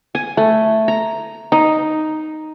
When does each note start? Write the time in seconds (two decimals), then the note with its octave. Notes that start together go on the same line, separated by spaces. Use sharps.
0.15 G#5
0.37 A3
0.88 A#5
1.52 D#4